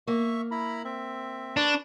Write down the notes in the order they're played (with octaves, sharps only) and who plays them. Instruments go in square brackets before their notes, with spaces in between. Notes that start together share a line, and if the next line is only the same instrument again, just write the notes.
[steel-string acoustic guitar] A#3 [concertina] E5 C#6
[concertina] E4 A#5 B5
C4 E5
[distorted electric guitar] D4 [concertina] B4 A5 C#6